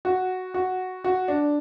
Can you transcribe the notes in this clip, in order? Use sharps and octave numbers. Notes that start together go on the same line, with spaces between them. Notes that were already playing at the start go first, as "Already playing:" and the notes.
F#4
F#4
F#4
D4